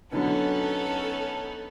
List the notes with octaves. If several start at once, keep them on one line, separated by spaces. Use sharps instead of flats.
B2 D3 F#3 B3 C#4 D#4 A4